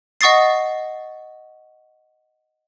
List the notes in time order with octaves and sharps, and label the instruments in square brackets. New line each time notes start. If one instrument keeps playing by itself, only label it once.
[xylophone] D#5 F#5 C#6 D#6 A6 C7